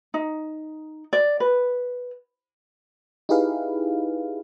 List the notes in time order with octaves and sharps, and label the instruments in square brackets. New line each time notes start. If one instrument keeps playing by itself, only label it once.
[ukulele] D#4
D5
B4
[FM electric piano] D#4 E4 G4 G#4 B4 F5